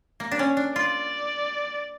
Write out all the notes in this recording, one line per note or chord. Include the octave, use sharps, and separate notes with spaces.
A#3
D4
C#4
D4
F4 D5